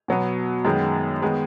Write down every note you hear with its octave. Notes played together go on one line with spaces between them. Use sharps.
B2 F#3 B3
F#2 D#3 G#3 B3
D#3 G#3 B3